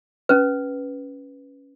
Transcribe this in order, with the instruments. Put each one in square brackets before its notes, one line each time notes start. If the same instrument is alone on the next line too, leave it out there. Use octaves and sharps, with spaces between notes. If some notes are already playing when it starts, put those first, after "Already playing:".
[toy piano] C#4 B4